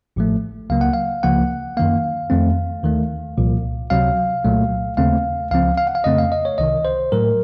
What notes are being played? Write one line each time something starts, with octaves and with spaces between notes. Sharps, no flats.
A1 A2 F3 A3
C#2 C#3 F#3 A#3 F5
F#5
F5
C#2 C#3 F3 A#3 F#5
F#2 D#3 A#3 F5
F2 D#3 A3 C4
D#2 D#3 A3
C2 A#2 F3
C#2 C3 F#3 C4 F5
C2 A#2 F#3 A3
D#2 C#3 A3 C4 F5
C#2 C#3 F3 C4 F5
F5
F#5
F5
F2 C#3 A3 C4 D#5
F5
D#5
C#5
C2 C3 D#3 D#5
C5
A2 F#3 A3 A#4